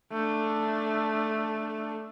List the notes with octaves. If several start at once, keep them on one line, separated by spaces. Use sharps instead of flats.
A3 D4